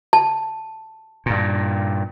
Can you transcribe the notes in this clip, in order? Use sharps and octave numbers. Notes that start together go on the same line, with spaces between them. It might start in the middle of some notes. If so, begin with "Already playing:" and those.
A5
G2 A#2